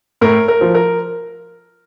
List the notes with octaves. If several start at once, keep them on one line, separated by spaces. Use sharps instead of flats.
A2 A#4
A#4
F3
A#4